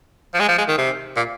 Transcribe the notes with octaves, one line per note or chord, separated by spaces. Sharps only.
F3
G#3
F3
G#3
D#3
C3
A#2